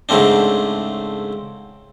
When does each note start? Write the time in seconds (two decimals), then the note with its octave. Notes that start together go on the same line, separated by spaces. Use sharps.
0.09 G#2 C#3 A3 C4 D4